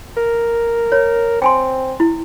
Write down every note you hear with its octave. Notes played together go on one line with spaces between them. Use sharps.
A#4
C#5
C4 G5 G#5 C6
E4